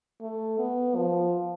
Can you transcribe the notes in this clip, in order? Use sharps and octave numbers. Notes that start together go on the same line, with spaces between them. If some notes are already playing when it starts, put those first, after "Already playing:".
A3
B3
F3